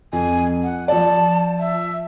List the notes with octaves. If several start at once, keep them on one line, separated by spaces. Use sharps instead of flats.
F2 G#5
F#5
F3 D5 A5
E5